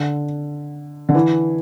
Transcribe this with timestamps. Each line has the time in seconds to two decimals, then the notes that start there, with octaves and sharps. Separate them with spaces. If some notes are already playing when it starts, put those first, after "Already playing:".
Already playing: D3
1.09 D3
1.15 E3